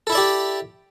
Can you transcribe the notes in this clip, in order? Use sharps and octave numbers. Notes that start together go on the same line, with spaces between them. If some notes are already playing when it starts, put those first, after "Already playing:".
E4 G4 A4 D5 E5